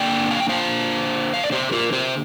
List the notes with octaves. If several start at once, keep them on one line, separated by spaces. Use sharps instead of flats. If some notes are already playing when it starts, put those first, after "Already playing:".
Already playing: D3 A#3 D4 D5 G5
F5
G5
C5 F5
F5
D5
G4 C5
F4 A#4
G4 C5